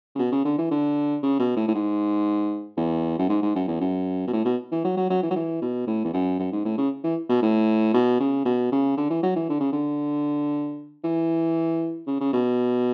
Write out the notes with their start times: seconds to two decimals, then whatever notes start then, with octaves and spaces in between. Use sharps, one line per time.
0.15 C#3
0.19 B2
0.32 C#3
0.45 D3
0.58 E3
0.71 D3
1.23 C#3
1.39 B2
1.56 A2
1.68 A2
1.74 G#2
2.77 E2
3.19 F#2
3.29 G#2
3.42 G#2
3.55 F#2
3.68 E2
3.80 F#2
4.27 B2
4.33 A2
4.45 B2
4.71 E3
4.84 F#3
4.97 F#3
5.10 F#3
5.23 E3
5.31 F#3
5.35 E3
5.62 B2
5.87 A2
6.05 E2
6.13 F#2
6.39 F#2
6.52 G#2
6.65 A2
6.78 C#3
7.04 E3
7.29 B2
7.42 A2
7.94 B2
8.20 C#3
8.45 B2
8.72 C#3
8.97 D3
9.10 E3
9.23 F#3
9.36 E3
9.49 D3
9.60 C#3
9.72 D3
11.04 E3
12.07 C#3
12.20 C#3
12.33 B2